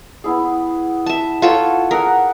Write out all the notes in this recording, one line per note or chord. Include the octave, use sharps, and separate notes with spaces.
B3 E4 G#4
E5 A5
F4 A4 C#5 F#5 G5
G#4 A#4 E5 F#5